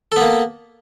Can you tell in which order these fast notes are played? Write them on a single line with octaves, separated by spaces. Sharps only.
A4 B3 A#3